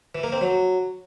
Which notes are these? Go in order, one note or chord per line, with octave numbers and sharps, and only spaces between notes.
E3
A#3
C4
F#3